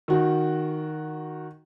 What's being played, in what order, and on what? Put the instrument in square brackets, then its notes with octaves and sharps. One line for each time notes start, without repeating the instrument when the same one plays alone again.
[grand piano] D#3 F#4